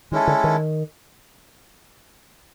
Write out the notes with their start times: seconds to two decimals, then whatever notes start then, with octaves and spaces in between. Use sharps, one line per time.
0.12 D#3 G#3 C#4 E4 A4
0.27 D3
0.44 D#3